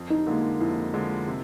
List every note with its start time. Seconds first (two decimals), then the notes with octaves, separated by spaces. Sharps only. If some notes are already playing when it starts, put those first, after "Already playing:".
Already playing: F2
0.10 D#4
0.27 D3 F3 G#3 A#3
0.60 F2 E4
0.94 D3 F3 G#3
1.27 C3